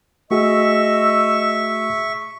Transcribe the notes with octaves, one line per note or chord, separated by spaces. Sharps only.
A3 F#4 G#4 D#5 E5 C#6 E6